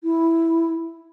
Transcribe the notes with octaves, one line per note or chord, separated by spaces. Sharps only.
E4